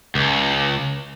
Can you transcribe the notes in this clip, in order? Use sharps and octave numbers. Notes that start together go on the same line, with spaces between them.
C#2